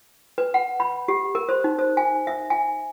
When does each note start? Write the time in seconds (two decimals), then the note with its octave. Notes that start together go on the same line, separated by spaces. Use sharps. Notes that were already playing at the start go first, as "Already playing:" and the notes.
0.38 B4
0.54 F#5
0.80 B5
1.08 G4
1.35 A#4
1.49 C5
1.64 D#4
1.79 C5
1.97 G#5
2.27 E5
2.50 G#5